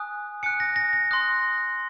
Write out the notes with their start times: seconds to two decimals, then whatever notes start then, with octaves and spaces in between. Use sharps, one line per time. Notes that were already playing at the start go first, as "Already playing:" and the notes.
Already playing: G#5 D#6 F#6
0.43 G#5 D#6 F#6 C#7
0.60 A#6
0.76 A#6
0.93 A#6
1.11 C6 D#6 F#6